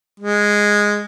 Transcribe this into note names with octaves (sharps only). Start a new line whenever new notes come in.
G#3